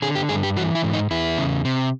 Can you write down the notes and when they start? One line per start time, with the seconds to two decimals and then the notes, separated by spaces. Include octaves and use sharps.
0.02 D3 G#4
0.15 G4
0.29 G2 G#4
0.43 G4
0.57 E3 F#4
0.75 E4
0.83 G#2
0.93 D#4
1.11 E2 E4
1.38 C#3
1.65 C3